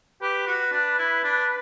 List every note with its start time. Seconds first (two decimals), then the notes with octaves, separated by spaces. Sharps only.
0.21 G4 B4
0.47 F#4
0.72 D4
0.99 E4
1.24 D4